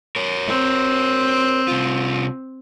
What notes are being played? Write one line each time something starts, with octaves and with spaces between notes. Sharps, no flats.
A#4 C#5
C4
C2 F4